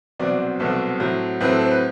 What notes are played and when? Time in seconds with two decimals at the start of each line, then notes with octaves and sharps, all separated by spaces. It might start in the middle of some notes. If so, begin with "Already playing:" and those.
0.20 C2 B2 F#3 C4 D5
0.39 C5
0.59 C2 B2 F#3 C4 A4
1.00 A2 F#3 C4
1.41 A2 F#3 C4 B4
1.50 A4
1.61 C5
1.71 B4